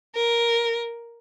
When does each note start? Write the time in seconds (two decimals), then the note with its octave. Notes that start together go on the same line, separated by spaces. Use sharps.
0.15 A#4